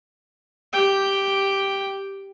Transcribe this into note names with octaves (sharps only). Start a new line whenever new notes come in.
G4 G5